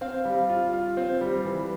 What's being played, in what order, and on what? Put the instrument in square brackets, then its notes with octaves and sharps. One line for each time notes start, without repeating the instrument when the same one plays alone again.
[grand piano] C4 [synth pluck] F5
[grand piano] G3
F4
F4
C4
G3
E3